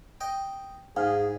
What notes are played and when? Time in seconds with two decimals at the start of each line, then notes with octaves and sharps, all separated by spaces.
0.21 D#5 G5
0.97 G#2 D#4 G#4 F5